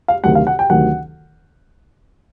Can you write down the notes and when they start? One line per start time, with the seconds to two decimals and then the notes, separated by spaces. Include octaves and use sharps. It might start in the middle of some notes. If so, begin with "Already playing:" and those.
0.08 F5
0.24 D2 C3 D#3 F#3 F#5
0.35 F5
0.47 F#5
0.59 G5
0.70 D2 C3 D#3 F#3 F#5